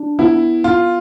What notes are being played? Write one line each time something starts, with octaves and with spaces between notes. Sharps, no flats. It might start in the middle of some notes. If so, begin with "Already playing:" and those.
Already playing: D4
B3 E4
B3 F4